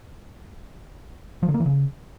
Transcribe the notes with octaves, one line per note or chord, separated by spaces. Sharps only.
F3
D3
A#3
E3
C#3